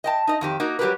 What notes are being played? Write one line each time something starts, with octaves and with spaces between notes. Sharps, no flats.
D#5 G5 A5
D#4 D#5
F2 D#3 G4
A#3 D#4 F#4
F#3 G3 G4 G#4 A#4 B4